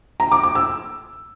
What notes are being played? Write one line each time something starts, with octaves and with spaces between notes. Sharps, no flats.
A#5
D6
D6
E6